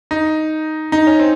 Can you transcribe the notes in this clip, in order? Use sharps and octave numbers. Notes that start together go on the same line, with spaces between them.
D#4
D#4
C#4
C4